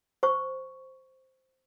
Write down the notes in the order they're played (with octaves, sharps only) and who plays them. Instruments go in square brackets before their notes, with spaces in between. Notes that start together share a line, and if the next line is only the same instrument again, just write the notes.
[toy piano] C5 C#6